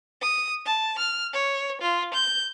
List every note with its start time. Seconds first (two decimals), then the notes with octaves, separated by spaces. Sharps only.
0.21 D#6
0.65 A5
0.98 F6
1.33 C#5
1.81 F4
2.13 G6